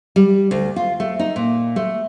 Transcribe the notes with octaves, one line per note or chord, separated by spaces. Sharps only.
G3
D2
F4
A3
D#4
A#2
A3